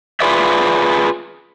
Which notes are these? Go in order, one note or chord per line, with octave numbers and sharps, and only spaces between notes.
F4 G#4 B4 D5 E5